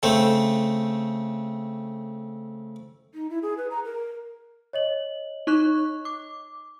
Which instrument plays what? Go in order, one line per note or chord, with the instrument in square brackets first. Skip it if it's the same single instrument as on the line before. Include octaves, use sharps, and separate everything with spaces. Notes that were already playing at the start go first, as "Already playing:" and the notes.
[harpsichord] C#3 A3 C4
[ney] D#4
E4
G#4
B4
A#5
A#4
[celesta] C#5 D#5 F#7
[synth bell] D#4 C#6 F#6
D6